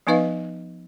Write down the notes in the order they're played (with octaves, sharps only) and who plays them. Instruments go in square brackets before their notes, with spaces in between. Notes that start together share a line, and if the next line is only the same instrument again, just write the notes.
[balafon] F3 B3 D#4 B4 D#5 F5